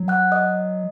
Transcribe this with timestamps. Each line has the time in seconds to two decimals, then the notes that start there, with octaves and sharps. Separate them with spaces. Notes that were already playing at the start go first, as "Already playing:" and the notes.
Already playing: F#3
0.08 F#5 F#6
0.32 D#5 D#6